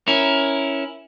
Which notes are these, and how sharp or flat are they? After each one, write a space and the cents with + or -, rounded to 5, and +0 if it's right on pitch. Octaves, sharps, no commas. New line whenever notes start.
C#4 +0 E4 +0 A#4 +10